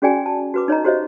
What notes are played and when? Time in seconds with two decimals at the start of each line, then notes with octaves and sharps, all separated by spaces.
0.02 C#4 F#4 G#4 D5 G5 G#5
0.26 A5
0.54 F#4 B4 D6
0.68 D#4 C#5 D#5 A#5
0.84 F#4 G4 C5 C#5 D#5 E5